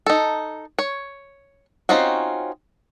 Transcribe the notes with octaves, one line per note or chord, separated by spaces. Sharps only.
D#4 A4
C#5
C4 C#4 D#4 F4 F#4